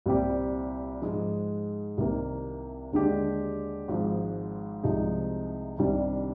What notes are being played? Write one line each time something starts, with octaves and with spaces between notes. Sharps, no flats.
C2 A#2 G3 C4 G4
G#2 F3 G#3
C2 C3 D#3 A#3
D#2 D3 G#3 D4 G4
G#1 G#2 F3
C2 C3 F3 G#3 D#4
C2 C3 D#3 G3 D4